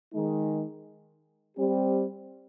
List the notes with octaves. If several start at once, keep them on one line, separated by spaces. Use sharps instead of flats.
D#3 G#3 D#4
G3 C4 G4